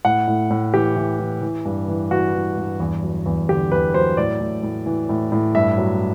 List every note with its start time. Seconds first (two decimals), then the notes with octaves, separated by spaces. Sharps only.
0.05 A2 F#5
0.28 A2
0.50 A2
0.74 E3 G4
0.96 E3
1.19 E3
1.42 E3
1.65 G2
1.88 E3
2.11 E3 F#4
2.34 E3
2.57 G2
2.80 E2
3.03 F#3
3.26 E2
3.49 D3 G4
3.72 E2 B4
3.94 F#3 C5
4.17 A2 D5
4.41 A2
4.63 A2
4.86 E3
5.09 A2
5.32 A2
5.55 G2 E5
5.78 F#3